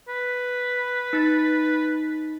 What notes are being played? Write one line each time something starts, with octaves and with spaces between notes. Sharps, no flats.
B4
D#4 A6